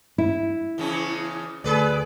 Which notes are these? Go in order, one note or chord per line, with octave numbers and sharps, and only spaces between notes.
E4
E2 C#3 C#4
D2 G#4 B4 D5